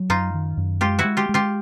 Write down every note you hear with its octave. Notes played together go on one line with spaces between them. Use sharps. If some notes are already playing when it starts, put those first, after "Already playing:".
Already playing: F#3
F#2 D#4 F4
D#3
F#2
G#3 F4 G4
E4 F#4
G#3
F4 G4
G#3
F4 G4